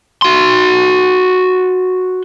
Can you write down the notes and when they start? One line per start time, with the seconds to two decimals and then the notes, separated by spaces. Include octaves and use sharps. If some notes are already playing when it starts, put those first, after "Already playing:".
0.22 F#4 C6